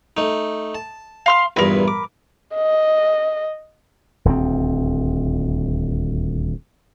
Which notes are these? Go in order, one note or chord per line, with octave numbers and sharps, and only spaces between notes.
A3 D#4
A5
F5 C6 F6
A#1 E2 G2 A#4 B4
D6
D#5
D#1 D2 G3 C4